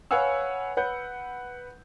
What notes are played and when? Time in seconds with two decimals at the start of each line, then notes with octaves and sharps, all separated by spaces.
0.11 B4 C#5 F5 F#5 G#5 E6
0.77 B4 F#5 G6